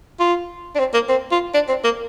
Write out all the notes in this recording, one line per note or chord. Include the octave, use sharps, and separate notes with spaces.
F4
D4
C4
A#3
C4
F4
D4
C4
A#3